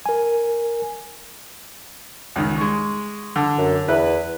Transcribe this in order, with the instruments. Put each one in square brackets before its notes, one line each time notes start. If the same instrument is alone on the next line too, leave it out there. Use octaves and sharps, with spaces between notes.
[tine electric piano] A#4 G#5
[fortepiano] C#2 D#3
G#3 C#6
D3
[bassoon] F#2
[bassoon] E2 [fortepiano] E4 B4